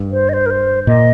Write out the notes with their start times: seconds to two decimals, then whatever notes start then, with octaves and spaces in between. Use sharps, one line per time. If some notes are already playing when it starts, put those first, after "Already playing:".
Already playing: G2
0.12 C5
0.29 D#5
0.33 C5
0.46 A#4
0.50 C5
0.87 A#2 D#5